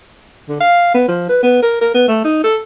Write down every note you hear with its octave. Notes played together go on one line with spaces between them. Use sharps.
D3
F5
B3
F3
B4
B3
A#4
A#4
B3
A3
D#4
A4